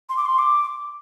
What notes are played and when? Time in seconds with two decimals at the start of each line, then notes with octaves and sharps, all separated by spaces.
0.09 C6
0.17 D6
0.26 C6
0.39 D6